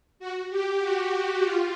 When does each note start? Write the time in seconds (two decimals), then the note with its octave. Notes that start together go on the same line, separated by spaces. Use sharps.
0.19 F#4
0.50 G4
0.81 F#4
1.13 F#4
1.43 F4